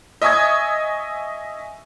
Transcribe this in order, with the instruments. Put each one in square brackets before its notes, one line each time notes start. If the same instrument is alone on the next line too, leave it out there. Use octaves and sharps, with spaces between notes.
[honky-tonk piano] D#5 E5 G#5 C#6 D#6 G#6